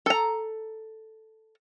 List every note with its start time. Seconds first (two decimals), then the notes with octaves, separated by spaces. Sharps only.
0.06 A4 A#5